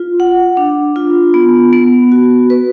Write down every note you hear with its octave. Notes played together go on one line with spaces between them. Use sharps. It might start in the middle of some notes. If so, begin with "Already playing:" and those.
Already playing: F4
F#5
D4
F4
B3
B3
F#4
B4